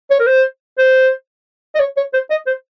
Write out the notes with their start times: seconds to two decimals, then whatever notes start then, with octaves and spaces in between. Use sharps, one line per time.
0.10 C#5
0.19 A#4
0.27 C5
0.78 C5
1.75 D#5
1.80 C#5
1.97 C#5
2.13 C5
2.30 D#5
2.47 C5